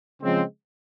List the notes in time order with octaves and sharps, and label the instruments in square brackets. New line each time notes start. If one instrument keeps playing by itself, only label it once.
[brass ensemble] C#3 F3 G#3 C4